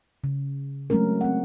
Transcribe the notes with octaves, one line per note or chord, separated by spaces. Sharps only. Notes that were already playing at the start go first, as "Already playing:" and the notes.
C#3
F#3 G#3 A3 C4 C#4 A#4
C4 F#5